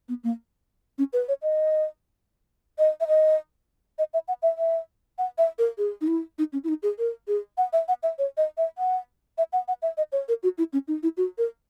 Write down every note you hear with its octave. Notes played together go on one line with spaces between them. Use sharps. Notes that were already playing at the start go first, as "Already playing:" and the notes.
B3
A#3
C#4
B4
C#5
D#5
D#5
E5
D#5
D#5
E5
F#5
E5
E5
F#5
E5
A#4
G#4
D#4
E4
D#4
C#4
E4
D#4
G#4
A#4
G#4
F#5
E5
F#5
E5
C#5
D#5
E5
F#5
E5
F#5
F#5
E5
D#5
C#5
A#4
F#4
E4
C#4
D#4
E4
F#4
A#4